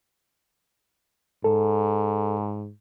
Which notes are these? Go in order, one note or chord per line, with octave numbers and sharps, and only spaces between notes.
G#2 A4